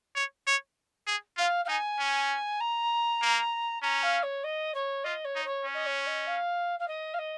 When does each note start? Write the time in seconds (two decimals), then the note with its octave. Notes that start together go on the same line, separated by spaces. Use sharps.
0.15 C#5
0.47 C#5
1.07 G#4
1.37 F4 F5
1.65 F5
1.68 D#4 G#5
1.99 C#4
2.60 A#5
3.22 A#3
3.82 C#4 A#5
4.02 F5
4.22 C#5
4.43 D#5
4.74 C#5
5.04 F4 D#5
5.24 C#5
5.35 D#4
5.45 C#5
5.65 C#4
5.74 D#5
5.86 C#5
6.06 D#5
6.27 F5
6.79 F5
6.87 D#5
7.13 F5
7.18 D#5